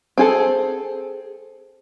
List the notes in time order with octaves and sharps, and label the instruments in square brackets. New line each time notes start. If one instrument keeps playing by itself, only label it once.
[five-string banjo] C4 G#4 A4